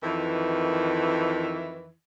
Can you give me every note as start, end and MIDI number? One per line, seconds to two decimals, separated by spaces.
0.03 1.93 41
0.03 1.93 51
0.03 1.93 52